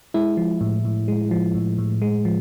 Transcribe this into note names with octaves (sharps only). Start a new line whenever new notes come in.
G#3 E4
F3
A2
A2
G#3
F3
A2
A2
G#3
F3